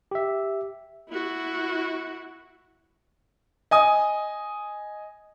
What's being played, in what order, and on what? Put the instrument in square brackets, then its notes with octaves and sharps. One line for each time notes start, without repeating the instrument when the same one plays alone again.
[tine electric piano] G4 E5
[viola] E4 F#4
[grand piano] D#5 G#5 D#6